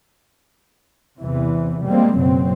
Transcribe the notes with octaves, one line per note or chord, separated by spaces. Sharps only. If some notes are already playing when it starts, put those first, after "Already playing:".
E2 C3 E3
G3 G#3 A#3 C4
F#1 B2 F#3 C4